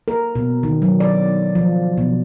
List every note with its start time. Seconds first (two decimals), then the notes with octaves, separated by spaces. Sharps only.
0.08 A#4
0.35 B2
0.63 D#3
0.82 F#3
1.00 D5
1.55 F3
1.97 B2